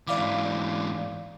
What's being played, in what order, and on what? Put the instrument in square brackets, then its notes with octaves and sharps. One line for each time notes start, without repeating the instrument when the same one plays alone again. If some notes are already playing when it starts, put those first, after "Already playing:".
[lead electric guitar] G#2 E3 [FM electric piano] D5 F5 D6